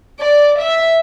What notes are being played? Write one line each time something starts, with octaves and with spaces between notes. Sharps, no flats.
D5
E5